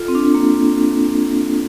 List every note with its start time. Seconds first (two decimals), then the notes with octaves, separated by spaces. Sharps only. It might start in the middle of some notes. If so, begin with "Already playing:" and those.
Already playing: F4 A4
0.08 C4
0.15 D4
0.35 A#3